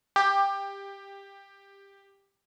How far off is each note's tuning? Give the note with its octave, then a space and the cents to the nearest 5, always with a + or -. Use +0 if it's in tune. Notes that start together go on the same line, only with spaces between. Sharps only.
G4 +15